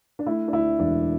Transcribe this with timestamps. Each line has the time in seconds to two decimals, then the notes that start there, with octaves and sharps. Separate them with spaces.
0.19 D4
0.26 A3 E4
0.48 D4
0.53 D2 E4
0.79 E1 D4